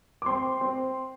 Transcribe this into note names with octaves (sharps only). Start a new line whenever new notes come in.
D6
C4 C6
C4